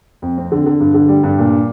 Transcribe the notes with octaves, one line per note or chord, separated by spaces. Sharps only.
F2
C4
D3
D3
G2
D3
G3
G2
A#2